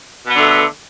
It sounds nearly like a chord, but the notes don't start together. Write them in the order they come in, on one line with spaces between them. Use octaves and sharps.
B2 B3 D3 A3